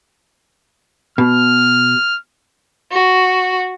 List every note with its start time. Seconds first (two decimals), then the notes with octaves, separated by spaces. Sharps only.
1.18 B2 F6
2.91 F#4